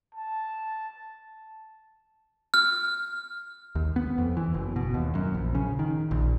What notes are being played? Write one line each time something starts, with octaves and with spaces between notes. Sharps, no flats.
A5
F6
D#2
B3
F2
E3
F#1
B2
D#2
F#2
A#1
C#3
D#3
A#1